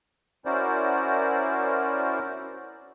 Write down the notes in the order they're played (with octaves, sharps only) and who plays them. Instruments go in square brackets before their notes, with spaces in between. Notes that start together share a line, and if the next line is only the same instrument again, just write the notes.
[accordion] C#4 E4 F#4 A#4 C5 D5